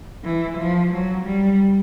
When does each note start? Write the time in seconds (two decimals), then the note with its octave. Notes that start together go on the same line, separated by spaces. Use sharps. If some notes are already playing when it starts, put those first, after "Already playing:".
0.24 E3
0.59 F3
0.93 F#3
1.26 G3